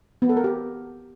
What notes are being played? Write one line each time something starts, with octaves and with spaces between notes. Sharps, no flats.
B3
A4
A#4
G4